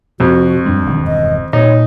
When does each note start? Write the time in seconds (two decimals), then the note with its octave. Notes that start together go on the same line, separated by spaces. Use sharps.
0.20 F2 C3 F3 F#4
0.66 F#2 G3 G#3 D4
0.86 E1 G2 D#3
1.07 D#5
1.53 A#2 D#4 C#5